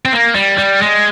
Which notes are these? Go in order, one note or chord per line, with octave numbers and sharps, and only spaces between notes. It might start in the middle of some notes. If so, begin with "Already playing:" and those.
C4
A#3
G3
G3
G#3